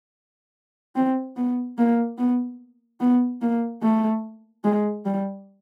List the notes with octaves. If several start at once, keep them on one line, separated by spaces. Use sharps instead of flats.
C4
B3
A#3
B3
B3
A#3
A3
G#3
G3